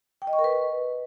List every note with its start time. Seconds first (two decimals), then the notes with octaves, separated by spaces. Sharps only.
0.22 G5
0.27 D#5
0.33 C#6
0.39 A#4
0.44 B4